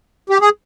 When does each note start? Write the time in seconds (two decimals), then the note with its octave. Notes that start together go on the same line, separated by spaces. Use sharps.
0.30 G4
0.41 G#4